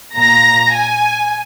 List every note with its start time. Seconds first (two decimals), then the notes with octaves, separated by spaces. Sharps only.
0.17 A#2 A#5
0.73 G#5